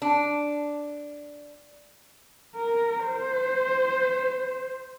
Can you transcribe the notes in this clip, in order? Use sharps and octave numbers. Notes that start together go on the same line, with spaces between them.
D4
A#4
C5